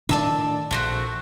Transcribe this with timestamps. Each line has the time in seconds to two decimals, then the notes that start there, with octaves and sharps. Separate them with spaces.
0.09 A2 D#3 D4 D5 A5 E6
0.71 A#1 A3 C4 F#4